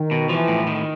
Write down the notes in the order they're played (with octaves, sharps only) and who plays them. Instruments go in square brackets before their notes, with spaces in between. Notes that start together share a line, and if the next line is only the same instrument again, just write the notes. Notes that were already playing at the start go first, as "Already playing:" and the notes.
Already playing: [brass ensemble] D#3
[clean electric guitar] B2
[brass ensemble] E3 [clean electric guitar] F3
[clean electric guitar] A2
D#3